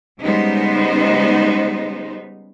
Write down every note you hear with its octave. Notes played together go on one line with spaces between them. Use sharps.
C#3 G3 G#3 B3 D#4 C5